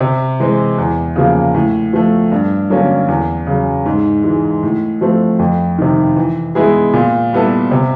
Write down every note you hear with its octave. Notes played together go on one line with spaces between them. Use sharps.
C3
E3 G#3 C4
E2
C#3 F3 A#3
A2
F3 A3
G2
D3 F#3 A#3 C#4
E2
C#3 F#3
G#2
E3 G#3
A2
F3 A3 C4
F2
C3 D#3
E3
G#3 B3 E4 G#4
A#2
G3 B3 E4 A4
C3